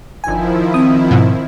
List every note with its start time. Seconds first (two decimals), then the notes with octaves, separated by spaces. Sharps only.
0.24 G1 D#3 F3 E4 G#5
0.74 C4 D#6
1.11 G#2 B2